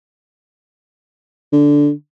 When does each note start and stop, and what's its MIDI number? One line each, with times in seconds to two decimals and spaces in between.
1.53 1.90 50